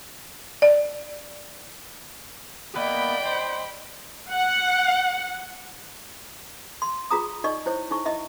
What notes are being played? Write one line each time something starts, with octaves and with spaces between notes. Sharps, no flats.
D5
A#3 B3 B4 D5 D#5 G5 B5
C5
F#5
C6
F4 G#4 A#5 D#6
D#4 D5 D#5 C#6
E4 C5 C#5
D#4 E4 C#6
E4 D#5 E5